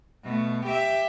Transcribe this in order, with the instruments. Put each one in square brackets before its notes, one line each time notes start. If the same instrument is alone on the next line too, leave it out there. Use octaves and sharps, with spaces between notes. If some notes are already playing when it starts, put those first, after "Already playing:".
[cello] B2 A3
G4 E5